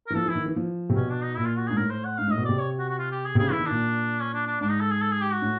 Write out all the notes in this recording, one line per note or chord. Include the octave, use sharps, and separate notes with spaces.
A#4
E3
F3 A4
E3 E4
D#3
E3
F3
C3
B2 C#4
D4
D#4
A#2 E4
F4
F#4
G#2 G#4
A2 A#4
C5
F#5
G#2 F5
A2 D#5
B2
C3 D5
C#5
F#4
F#4
F4
G4
G#4
C3
C#3 G#4
E3 E4
D#3
A#2 D4
C#4
D4
D4
G#2 D4
D#4
A4
G#4
A4
G#4
G4
F#4
A2